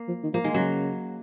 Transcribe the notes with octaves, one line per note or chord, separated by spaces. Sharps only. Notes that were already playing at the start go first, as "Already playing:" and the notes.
Already playing: A#3
F3
D#3
F3 A#3
D#3 G#3
C#3 F#3